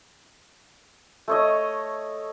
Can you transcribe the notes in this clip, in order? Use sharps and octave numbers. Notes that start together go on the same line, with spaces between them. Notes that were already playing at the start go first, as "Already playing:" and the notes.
A3 C#5 D#5